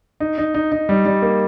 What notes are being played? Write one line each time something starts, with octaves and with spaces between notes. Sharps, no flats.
D#4
D#4
D#4
D#4
G3
G3
A#3